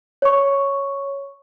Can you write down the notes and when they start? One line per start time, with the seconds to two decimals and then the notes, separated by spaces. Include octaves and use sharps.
0.22 C#5 C#6